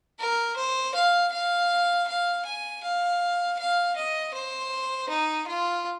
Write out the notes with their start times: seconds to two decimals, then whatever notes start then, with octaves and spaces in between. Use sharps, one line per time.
0.19 A#4
0.56 C5
0.94 F5
1.31 F5
2.07 F5
2.45 G#5
2.83 F5
3.58 F5
3.96 D#5
4.33 C5
5.09 D#4
5.47 F4